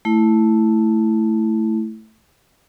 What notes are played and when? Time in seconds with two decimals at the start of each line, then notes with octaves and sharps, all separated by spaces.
0.05 A3 E4